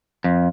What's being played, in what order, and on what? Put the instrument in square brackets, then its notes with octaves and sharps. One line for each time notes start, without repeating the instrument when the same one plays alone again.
[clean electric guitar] F2